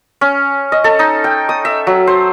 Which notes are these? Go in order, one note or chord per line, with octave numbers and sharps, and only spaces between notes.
C#4
D#5
A4
D#4
G5
D#6
E5
F#3
C5